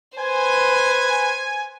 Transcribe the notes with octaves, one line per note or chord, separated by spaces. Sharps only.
B4 C5 G#5